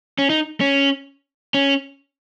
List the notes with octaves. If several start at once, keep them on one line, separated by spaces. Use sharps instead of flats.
C#4
D#4
C#4
C#4